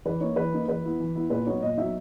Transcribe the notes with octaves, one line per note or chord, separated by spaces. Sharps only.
E3 B4
A#3 D#4 C#5
E3 B4
A#3 D#4
E3 B4
B3 E4
E3
B3 E4
A#2 B4
F#3 B3 D#4 C#5
A#2 D#5
F#3 B3 D#4 E5